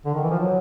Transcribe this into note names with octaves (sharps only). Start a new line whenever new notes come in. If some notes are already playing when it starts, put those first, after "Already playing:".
D3
D#3
E3
F3
F#3